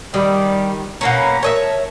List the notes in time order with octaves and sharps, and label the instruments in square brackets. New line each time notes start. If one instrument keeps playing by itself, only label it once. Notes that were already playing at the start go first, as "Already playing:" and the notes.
[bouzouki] D#3 [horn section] G3
[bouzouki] B2 A#3 C#4 [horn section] A#5
[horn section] A#4 A5 [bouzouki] C#5 D#5 E5